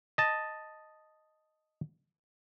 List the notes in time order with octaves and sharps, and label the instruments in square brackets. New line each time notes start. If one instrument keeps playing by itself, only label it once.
[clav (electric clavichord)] D#5 A5